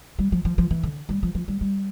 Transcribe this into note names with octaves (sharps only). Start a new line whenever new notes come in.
G3
F3
F3
F3
E3
D3
G3
F3
F3
G3
G3